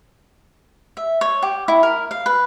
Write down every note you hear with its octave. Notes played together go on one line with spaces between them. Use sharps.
E5
C#5
G4
E4
A#4
F5
B4